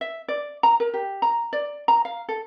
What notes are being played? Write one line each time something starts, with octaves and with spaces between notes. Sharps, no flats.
E5
D5
A#5
A#4
G4
A#5
D5
A#5
F5
A4